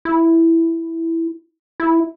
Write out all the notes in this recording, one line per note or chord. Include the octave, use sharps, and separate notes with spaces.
E4
E4